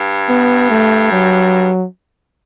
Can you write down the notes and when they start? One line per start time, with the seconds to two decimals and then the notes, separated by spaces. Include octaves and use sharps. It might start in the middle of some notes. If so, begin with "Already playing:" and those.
Already playing: G2
0.29 B3
0.70 A3
1.12 F#3